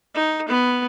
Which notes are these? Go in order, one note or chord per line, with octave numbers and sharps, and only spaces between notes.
D#4
B3